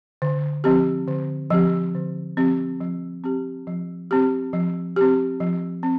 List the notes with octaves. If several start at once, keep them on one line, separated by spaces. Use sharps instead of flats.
D3
F3 C4 G4
D3
F3 C4 G4
D3
F3 C4 G4
F3
C4 G4
F3
C4 G4
F3
C4 G4
F3
C4